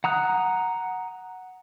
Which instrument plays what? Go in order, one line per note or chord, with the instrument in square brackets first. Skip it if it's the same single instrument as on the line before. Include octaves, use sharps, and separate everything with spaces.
[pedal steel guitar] F#5 A#5 D#6 F#6